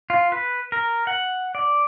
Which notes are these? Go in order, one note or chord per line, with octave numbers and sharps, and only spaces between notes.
F4
B4
A#4
F#5
D5